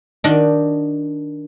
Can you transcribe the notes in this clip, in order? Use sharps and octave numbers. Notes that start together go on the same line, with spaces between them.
D#3 D4 F#4 D#5